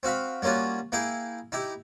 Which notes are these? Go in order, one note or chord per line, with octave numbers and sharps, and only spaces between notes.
C4 F#4 F5 B5
G3 A#3 C#4 F4 F#4
A#3 E4 G#4 G5
D#4 E4 G4